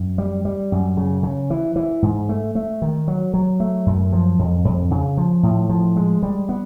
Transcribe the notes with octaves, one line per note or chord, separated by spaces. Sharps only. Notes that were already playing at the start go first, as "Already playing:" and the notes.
Already playing: F#2
G3
G3
F#2
C#3
C#3
E3
E3
G#2
A3
A3
D#3
F#3
F#3
A3
F#2
F3
F2
F2
C#3
F3
A2
F3
G#3
G3
B3